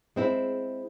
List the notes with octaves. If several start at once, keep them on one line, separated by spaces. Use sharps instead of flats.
G#3 C4 E4